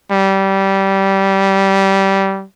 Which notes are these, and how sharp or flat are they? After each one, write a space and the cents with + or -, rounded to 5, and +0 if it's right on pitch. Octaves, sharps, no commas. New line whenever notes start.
G3 -15